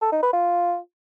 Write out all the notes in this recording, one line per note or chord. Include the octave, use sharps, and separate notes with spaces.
A4
D#4
B4
F4